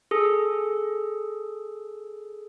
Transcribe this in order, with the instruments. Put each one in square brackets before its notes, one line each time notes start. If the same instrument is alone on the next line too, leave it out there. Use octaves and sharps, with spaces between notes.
[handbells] G#4 A4